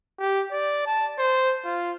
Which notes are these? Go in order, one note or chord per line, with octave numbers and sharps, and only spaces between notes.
G4
D5
A5
C5
F4